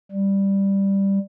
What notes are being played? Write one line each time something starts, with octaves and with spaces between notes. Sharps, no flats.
G3